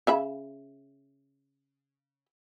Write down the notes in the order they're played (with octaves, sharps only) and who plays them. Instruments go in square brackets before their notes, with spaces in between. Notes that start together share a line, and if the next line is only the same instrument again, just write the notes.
[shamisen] C#3 E5 B5